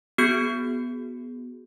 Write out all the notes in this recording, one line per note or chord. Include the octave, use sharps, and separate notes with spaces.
B3 F#4 G#4 G6 C#7